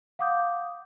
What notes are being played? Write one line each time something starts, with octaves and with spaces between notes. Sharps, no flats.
F5 F#5 D6 D#6 G6